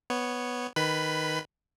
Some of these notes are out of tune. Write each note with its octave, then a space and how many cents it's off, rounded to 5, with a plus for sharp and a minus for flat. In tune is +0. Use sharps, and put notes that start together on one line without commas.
B3 +0 C#5 +0
D#3 +0 B4 +0 B5 +20